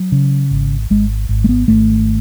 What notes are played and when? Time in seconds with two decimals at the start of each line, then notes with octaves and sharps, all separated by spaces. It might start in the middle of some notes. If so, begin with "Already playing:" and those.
Already playing: F#3
0.12 C#3
0.51 G#1
0.90 G#1 G#3
1.29 G#1
1.44 A3
1.49 B3
1.68 G#1 A3